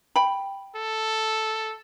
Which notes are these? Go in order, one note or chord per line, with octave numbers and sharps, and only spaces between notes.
G5 B5
A4